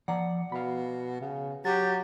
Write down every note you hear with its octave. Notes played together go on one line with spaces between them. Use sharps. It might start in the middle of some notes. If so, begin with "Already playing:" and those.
F3 D5 F#5 A#5
B2 F5 B5
C#3
F#3 G4 A6